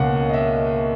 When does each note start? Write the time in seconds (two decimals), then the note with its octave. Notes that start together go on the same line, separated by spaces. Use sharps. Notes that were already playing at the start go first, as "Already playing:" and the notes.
Already playing: C#2 B2 A#3 C#4 F#5
0.29 D#5
0.34 E5